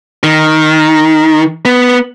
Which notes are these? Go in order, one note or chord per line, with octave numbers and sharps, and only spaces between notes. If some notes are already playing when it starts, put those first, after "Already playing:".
D#3
B3